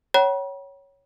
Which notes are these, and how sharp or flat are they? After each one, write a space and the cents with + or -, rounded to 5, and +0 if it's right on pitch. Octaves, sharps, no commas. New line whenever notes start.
C#5 +0 G5 -45 B5 -45